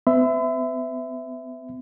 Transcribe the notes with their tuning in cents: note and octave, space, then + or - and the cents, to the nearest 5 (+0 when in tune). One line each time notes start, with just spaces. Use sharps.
B3 +45 E5 +0 B5 +45